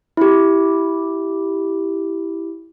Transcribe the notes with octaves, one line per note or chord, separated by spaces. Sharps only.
E4 G4